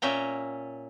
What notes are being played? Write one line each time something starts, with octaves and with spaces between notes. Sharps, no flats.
A#2 C#4 E5 G5 A#5